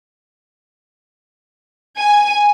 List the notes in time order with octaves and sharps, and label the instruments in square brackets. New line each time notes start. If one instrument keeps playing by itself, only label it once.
[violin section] G#5